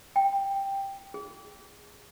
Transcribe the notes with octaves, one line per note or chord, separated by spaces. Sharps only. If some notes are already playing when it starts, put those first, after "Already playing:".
G5
G#4